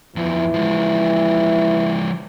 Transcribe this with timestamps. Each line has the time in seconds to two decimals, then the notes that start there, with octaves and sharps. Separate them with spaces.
0.16 E2 E3 F3
0.54 F3 G#3